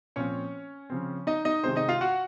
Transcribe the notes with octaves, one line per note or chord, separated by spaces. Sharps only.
A#2 F3 C4 C#4 C#5
C#3 F3 C4
D#4 D#5
D#4 D#5
C3 D#3 G#3 C4 C5
D#4 D#5
F4 F5
F#4 F#5